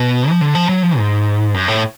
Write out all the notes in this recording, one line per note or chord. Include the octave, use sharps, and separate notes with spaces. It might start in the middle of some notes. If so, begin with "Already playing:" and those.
Already playing: B2
F3
D3
F3
F#3
F3
G#2
F#2
A2